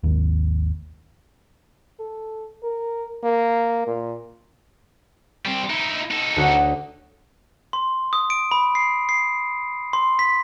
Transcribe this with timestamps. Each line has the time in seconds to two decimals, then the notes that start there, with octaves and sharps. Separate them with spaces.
0.03 G#1 D#2
2.00 A4
2.63 A#4
3.23 A#3
3.87 A#2
5.45 G3 C4
5.70 D#4 E4
6.11 D#4 A4
6.36 D2 F#4 C#5
7.73 C6
8.13 D#6
8.30 D7
8.51 B5
8.75 C7
9.09 C7
9.93 C6
10.19 B6